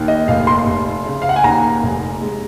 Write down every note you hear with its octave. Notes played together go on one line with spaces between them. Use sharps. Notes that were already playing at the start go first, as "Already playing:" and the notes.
Already playing: D#2 D#3
D#5
F1 F5
C6
F1
C#3
F5
F#5
G#5
D#2 A#5
F1
G#3